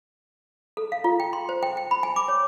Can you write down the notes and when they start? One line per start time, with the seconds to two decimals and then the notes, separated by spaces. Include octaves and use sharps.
0.77 A4
0.92 F5
1.04 F4
1.20 G5
1.33 C6
1.49 C5
1.63 G5
1.77 G5
1.91 B5
2.03 G#5
2.16 D6
2.28 C#5